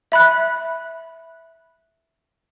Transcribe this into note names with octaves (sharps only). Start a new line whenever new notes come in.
E5 B5 F#6